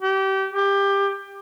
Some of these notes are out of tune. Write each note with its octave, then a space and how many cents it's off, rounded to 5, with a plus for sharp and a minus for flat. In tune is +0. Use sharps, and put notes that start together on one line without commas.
G4 -25
G4 +20